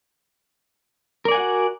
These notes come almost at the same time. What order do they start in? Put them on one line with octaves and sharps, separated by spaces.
A#4 D5 G#5 F#5 F#4